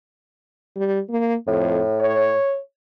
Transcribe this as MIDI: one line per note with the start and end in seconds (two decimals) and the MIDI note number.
0.76 0.99 55
1.10 1.35 58
1.47 1.80 41
1.47 2.34 45
2.00 2.59 73